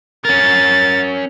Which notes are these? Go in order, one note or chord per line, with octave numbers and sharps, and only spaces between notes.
C#4 A#4 A6